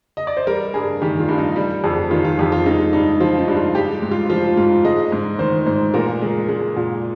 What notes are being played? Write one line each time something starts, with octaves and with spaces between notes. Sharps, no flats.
D#5
D5
C5
G3 A#4
G2 G#4
D#3 G4
F4
G2
D#4
G3
F2 G#4
D#3 F4
F4
F2 G4
F4
G#3 D#4
G2 D#4
F3 F4
D#4
G2
F4
G#3 G4
G#2
F4
F3 F4
G#2 F4
G#3 D#5
G#2
D#3 C5
G#2 C5
A#2 A#4
G#3
G#3
A#2